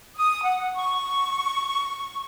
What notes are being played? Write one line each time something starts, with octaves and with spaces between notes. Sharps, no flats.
D#6
F#5
C#6